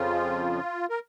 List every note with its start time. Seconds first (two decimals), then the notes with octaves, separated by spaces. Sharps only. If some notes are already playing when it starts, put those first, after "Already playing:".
Already playing: F2 C#3 F3 F4
0.90 A#4